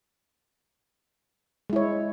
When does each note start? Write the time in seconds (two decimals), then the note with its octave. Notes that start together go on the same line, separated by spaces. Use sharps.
1.70 G#3
1.73 E4
1.76 C#5